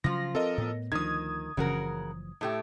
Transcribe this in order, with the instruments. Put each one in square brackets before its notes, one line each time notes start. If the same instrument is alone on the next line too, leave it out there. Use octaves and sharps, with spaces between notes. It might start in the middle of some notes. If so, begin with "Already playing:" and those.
[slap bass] C#3 F#3 [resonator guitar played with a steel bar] F3 F4 [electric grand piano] A#6
[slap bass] C4 [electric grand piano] A4 A#4 D#5
[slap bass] A2 B3
[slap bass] D2 F3 [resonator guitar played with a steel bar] D#3 [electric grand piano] D#6 G#6
[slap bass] F#1 E3 F3 [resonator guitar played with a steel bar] C#3 F#4 A#4
[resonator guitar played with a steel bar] A2 A3 G4